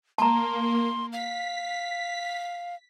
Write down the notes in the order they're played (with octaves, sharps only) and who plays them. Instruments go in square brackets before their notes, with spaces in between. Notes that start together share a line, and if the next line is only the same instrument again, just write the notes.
[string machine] A#3 [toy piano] A5 A#5 [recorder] C6
[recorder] F5 [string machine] B6